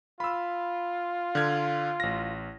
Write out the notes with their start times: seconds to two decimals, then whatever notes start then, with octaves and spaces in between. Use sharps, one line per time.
0.20 F4 B5 E6
1.35 D3 F6 G#6
2.00 A1 A#6